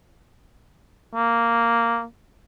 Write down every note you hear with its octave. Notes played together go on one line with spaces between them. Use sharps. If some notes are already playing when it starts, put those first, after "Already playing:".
A#3